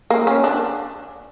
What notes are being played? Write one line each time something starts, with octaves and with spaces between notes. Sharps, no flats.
A#3
C#4
D4